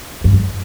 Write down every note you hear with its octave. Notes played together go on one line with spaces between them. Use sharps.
G2
F#2